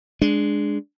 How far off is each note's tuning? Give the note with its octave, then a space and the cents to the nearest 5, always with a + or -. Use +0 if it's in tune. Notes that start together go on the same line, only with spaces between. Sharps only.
G#3 +0 D4 +0